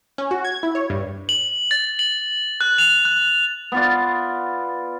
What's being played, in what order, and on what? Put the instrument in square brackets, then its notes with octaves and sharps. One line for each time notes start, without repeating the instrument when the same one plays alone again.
[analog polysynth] C#4
F#4
G#6
E4
C#5
G2
[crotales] F#7
A6
F#7
F#6
F7
F#6
[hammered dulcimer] B3 F4 D5